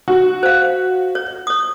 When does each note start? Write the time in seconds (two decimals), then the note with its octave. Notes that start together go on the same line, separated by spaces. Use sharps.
0.08 F#4
0.43 C5 F5
1.15 C#5
1.47 C#5 D#6